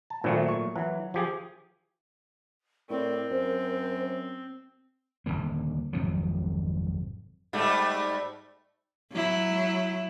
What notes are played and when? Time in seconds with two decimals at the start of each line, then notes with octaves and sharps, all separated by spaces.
0.10 A5
0.24 G#1 A#2 F#3 A3
0.48 C#6
0.76 E3 F#3
1.14 F3 G4 G#4
2.90 A2 C4 A#4 D5
3.31 F#2 C5
5.26 D#1 F#2 D3 A#3
5.93 G#1 F2 C3 F#3
7.53 G#2 G3 A3
9.13 F#3 E4